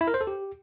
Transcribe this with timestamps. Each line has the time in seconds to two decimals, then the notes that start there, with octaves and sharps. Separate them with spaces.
0.01 E4
0.07 A#4
0.14 C5
0.21 A4
0.27 G4